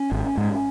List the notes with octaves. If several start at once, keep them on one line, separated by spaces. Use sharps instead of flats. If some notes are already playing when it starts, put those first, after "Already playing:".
Already playing: C#4
G#1
G#2